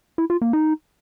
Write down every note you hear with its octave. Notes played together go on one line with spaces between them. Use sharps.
E4
F4
A#3
D#4